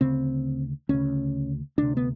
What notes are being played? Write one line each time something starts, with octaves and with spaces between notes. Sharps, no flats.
D2 C#3 C4
D2 C#3 C#4
D2 C3 D4
B3